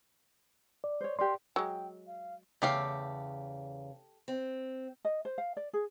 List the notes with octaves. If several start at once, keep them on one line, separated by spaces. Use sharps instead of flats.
D5
C5 C#5
G4 A#4 D5 C6
F#3 G#3 G5
F5
E2 C#3 A3 G4 F5
C4
D#5
C5
F5
D5
G#4